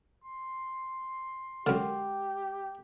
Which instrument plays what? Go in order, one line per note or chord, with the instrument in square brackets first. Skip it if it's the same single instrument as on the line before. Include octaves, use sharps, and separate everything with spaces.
[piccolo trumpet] C6
[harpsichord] F#2 D3 [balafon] G#3 A#4 [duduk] G4